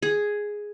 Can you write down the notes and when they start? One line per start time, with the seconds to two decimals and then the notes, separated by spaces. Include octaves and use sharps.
0.02 G#4